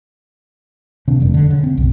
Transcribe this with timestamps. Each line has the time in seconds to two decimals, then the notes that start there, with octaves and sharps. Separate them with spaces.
1.08 C3 D#3 C4 D4
1.20 F1 E2 G2
1.34 D3
1.51 C#3
1.64 C4
1.77 B1 F#2